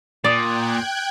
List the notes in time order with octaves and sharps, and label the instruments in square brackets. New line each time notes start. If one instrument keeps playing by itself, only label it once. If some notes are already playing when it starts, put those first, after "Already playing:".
[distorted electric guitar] A#2 [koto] D5 [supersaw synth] G5 F#6 G#6 [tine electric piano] D6 D#6 A6